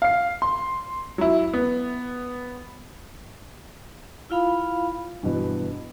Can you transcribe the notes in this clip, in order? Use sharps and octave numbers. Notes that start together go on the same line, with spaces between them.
F5 C7
C6
F#3 E4
B3
E4 F4 F5 B5
G2 B2 E3 B3